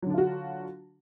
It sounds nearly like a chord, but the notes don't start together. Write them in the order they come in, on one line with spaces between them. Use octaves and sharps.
F#3 D3 D4 F4 F#4